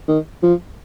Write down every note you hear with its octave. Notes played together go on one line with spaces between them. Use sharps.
D#3
F3